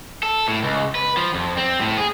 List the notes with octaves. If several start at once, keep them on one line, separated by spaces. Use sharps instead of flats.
A4
A2
C#2
B4
F3
F2
C4
A2
G#4